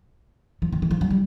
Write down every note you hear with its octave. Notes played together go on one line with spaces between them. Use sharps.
F3
D#3
E3
F3
F#3
G3